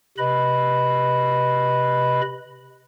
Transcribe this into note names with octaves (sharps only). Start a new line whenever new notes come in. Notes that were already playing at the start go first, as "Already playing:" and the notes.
C3 B4 D#5 B5